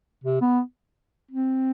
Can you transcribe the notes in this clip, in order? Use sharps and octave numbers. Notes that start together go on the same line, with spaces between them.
C3
B3
C4